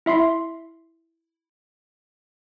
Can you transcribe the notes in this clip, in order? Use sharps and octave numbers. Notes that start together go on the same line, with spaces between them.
E4 E5 C6 C7